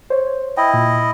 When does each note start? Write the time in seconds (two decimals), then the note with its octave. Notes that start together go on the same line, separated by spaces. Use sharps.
0.10 C5 C#5
0.57 E4 D#5 G5
0.74 A#2